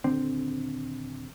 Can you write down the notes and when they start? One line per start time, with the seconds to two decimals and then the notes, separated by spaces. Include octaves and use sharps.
0.04 D#1 D3 C4